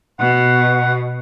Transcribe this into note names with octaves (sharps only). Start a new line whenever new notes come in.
B2 F#5